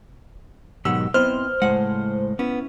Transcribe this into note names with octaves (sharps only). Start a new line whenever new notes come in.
G#2 B2 D#3 F#3 G4 F#5 E6
B3 C4 E4 C5 D#5 F6
C#2 A2 G#3 F#5
B3 C#4 E4